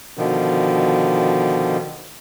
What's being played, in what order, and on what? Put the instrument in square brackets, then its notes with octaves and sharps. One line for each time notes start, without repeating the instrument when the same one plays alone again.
[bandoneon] B2 D3 D#3 F3